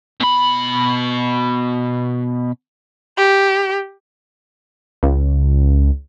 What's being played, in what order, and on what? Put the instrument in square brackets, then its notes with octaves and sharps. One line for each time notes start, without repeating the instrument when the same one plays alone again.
[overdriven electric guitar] B2 B5
[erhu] G4
[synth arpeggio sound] C#2